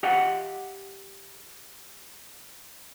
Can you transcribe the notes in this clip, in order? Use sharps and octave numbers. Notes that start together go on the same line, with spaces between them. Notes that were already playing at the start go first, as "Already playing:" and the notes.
G4 D#5 F5 F#5